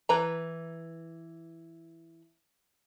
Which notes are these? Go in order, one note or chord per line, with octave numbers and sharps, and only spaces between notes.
E3 B4 A#5